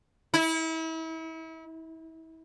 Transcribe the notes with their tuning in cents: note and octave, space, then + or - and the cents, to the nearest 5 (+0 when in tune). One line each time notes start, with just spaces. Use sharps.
E4 -35